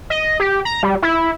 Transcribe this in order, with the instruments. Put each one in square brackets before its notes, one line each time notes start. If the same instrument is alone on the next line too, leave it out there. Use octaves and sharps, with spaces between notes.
[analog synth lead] D#5
G4
A#5
G3
E4